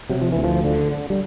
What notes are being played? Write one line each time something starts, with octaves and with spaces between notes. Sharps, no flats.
C3 F#3
F3
D2 E3
F3
D3
D3
G3